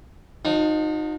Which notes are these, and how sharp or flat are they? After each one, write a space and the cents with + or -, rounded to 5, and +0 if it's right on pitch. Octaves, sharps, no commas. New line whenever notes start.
F3 +45 D#4 -10